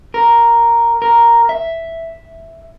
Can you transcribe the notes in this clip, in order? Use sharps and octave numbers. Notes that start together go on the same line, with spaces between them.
A#4
A#4
E5